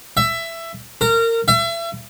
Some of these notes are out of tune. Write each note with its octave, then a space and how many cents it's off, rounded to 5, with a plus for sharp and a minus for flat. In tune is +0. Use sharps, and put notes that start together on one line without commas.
E5 +15
A#4 -25
E5 +35